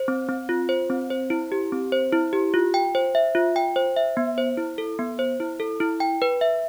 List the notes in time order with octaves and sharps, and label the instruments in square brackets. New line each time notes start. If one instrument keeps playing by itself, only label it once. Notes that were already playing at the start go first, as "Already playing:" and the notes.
Already playing: [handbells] C5
C4
C4
F4
C5
C4
C5
E4
G4
C4
C5
E4
G4
F4
G5
C5
E5
F4
G5
C5
E5
B3
C5
E4
A4
B3
C5
E4
A4
E4
G5
B4
E5